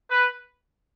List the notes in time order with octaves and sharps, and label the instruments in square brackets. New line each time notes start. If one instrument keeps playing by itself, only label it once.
[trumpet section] B4